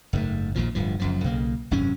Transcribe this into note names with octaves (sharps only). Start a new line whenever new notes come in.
F#1 G#2 D3 A3
A#1 D#2 A#2 F3
D1 G2 F3
F#1 F#2 F3
B1 C#3 A#3
G#1 F#2 C3 C#4